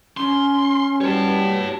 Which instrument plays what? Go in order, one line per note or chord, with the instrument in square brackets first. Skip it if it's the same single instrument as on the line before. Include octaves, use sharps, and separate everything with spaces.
[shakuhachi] C#4 [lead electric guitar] C6
[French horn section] G3 F#4 B4 [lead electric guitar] C#5 A5